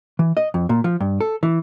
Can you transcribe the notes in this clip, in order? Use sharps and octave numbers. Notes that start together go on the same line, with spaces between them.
E3
D#5
F2
A#2
F3
G2
A4
E3